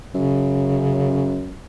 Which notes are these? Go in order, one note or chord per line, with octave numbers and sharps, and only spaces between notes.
F#2 C#3